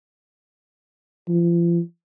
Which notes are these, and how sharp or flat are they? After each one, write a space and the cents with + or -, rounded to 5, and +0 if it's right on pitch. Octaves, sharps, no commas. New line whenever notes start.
F3 -35